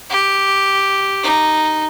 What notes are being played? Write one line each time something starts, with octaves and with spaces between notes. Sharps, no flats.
G4
D#4